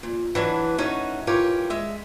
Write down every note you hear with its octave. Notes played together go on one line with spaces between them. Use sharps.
A#2
E3 F#3 D4 B4
A3 C#4 D#4 F#4
E3 F4 G4 A#4 C#5
G#3 E5